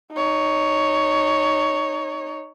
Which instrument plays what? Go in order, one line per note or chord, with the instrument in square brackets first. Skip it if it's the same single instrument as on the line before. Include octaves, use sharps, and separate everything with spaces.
[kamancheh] D#4 C#5